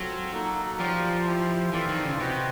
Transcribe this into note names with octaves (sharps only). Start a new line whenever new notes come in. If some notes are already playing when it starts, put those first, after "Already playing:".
Already playing: F#3 C4 F4 A4
A#3 D#4 F#4 A4
F3 G4 A#4 D5 F5
E4 G4 C5
E3 C4 F4 A4 D5 F5
D#3
C#3
C3 F#4 B4 D#5 G5